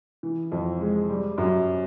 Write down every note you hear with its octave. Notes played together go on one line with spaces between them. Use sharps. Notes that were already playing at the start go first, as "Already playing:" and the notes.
E3
F2
G#3
G3
F#2